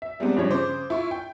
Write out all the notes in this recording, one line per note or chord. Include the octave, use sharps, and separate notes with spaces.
E5
G3 G#3 B3 C4 D4 D#4
G2 F3 C#4 C#5
C#3 C5 D6
E4 F4 C#6
G5